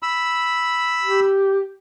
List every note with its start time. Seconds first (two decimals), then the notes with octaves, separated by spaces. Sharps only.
0.03 B5 E6
1.03 G4